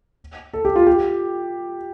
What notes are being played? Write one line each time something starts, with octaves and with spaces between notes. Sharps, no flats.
A4
G4
F4
G4